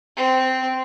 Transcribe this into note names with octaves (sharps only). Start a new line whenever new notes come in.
C4